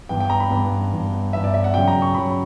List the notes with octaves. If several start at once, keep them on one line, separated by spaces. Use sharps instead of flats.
G2 E3 B3 G5
G5
A#5
B5
G2 E3 B3
G2 E3 B3
G2 E3 B3 E5
D5
E5
F#5
F#2 C#3 F#3 G5
A#5
C#6
F#2 C#3 F#3 B5